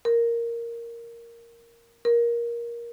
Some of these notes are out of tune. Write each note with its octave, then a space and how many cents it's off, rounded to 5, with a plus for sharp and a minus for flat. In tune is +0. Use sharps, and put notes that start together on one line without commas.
A#4 +0
A#4 +15